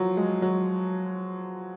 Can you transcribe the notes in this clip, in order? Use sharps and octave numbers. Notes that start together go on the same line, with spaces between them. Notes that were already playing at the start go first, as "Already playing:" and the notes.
Already playing: F3 F#3
G#3
F#3